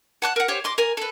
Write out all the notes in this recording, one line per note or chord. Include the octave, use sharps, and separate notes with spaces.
F#5 A5 F#6
A#4 F#5
G4 C5 C#5
D#5 C6 D6
A#4 G#5
A4 B4